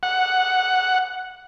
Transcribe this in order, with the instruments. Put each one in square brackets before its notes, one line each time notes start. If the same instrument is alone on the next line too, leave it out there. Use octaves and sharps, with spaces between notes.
[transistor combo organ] F#5